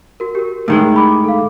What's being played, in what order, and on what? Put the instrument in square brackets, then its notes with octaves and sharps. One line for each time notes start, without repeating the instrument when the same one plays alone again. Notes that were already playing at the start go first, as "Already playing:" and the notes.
[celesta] F#4 A#4
G4 A#4
[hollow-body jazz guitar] A2 D#3 G#3
[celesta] B5 D6
A4 F5